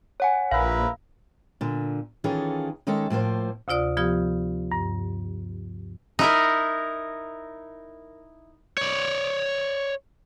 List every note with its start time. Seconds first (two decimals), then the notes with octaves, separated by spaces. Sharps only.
0.20 C#5 F#5 G#5
0.51 A#1 E4 A#4 B4 F5
1.61 A#2 D3
2.24 D#3 E3 C#4 F4 G#4 A4
2.87 D#3 G#3 C#4 D#4 A4
3.10 A2 F3 A#3 C5
3.68 D2 C3 F4 D5 D#6
3.97 F3 B3 F4 G4 D#6
4.72 G2
6.19 D#4 E4 A#4
8.77 C#5 D5